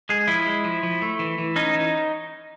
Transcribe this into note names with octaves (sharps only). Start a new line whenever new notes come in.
G#3 G#4
F3 E4
G#3
F3
F3
A3
E3
E3
C#4 D#4
E3